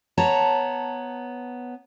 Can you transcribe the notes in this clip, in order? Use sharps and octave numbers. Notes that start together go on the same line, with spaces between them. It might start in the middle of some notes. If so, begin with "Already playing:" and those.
B3 C#5 A5 A#5